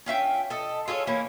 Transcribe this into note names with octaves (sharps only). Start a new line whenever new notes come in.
C#4 F4 E5 G5
A4 D#5
F4 G#4 A4 C#5
E3 A#3 C#4 E4